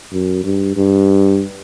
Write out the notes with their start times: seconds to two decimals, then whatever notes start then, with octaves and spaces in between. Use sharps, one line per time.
0.12 F#2
0.44 G2
0.76 G2